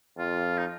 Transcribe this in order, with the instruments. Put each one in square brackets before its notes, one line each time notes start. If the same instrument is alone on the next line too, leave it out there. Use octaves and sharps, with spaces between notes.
[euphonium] F2 [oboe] F4
[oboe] D#4